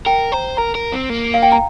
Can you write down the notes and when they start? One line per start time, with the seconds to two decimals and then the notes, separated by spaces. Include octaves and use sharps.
0.06 A#4 G5
0.32 C5 A#5
0.57 A#4 A#5
0.75 A#4
0.92 C4
1.10 A#3
1.34 F5
1.42 G5
1.52 A#5